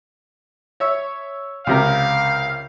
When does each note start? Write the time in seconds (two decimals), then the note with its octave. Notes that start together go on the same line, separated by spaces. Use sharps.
0.80 C#5 E5
1.67 C#2 C3 A#4 F5